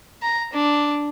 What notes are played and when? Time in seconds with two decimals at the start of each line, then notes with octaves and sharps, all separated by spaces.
0.22 A#5
0.53 D4